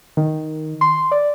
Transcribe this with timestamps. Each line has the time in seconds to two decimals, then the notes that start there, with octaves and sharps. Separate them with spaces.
0.17 D#3
0.81 C6
1.11 D5